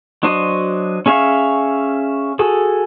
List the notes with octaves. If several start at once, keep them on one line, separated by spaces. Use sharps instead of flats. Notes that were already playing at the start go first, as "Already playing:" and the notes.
F#3 D4 F#4 C5 D#5
C#4 G#4 E5 F5 C#6
F#4 G#4 A4